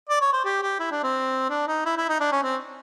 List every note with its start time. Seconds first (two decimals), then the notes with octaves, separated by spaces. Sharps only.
0.09 D5
0.21 C#5
0.33 C5
0.45 G4
0.62 G4
0.80 E4
0.91 D4
1.03 C4
1.50 D4
1.68 D#4
1.85 E4
1.98 E4
2.09 D#4
2.20 D4
2.32 C#4
2.43 C4